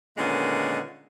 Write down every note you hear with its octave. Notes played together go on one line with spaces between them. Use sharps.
A#2 D3 D#3 G#3 B3 C#4